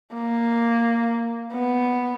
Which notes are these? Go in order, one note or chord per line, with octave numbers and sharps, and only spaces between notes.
A#3
B3